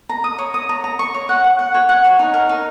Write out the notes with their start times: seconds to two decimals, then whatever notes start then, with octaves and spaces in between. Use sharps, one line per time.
0.09 A#5
0.24 D#6
0.39 C#5
0.54 D#6
0.69 A#5
0.84 A#5
0.99 C#6
1.14 C#5
1.29 F#5
1.44 F#5
1.59 F#5
1.74 C#5
1.89 F#5
2.04 C#5
2.19 D#4
2.34 A#4
2.49 D#4